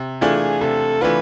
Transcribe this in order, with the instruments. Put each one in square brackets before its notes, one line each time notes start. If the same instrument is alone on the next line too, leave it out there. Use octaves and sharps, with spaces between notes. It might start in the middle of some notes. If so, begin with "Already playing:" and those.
Already playing: [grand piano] C3
[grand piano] E3 A3 D4 F4 [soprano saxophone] G#4
[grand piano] C3 [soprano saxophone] A4
[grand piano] E3 A3 D4 F4 [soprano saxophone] B4